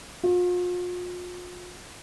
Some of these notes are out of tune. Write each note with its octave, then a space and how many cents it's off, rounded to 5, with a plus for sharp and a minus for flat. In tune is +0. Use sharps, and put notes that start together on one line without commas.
F4 +40